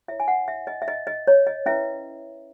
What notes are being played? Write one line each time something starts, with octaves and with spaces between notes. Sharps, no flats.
E4 A#4 C#5 E5
G#5
F#5
E5
D#5
E5
D#5
D#5
C#5
D#5
C#4 E4 B4 E5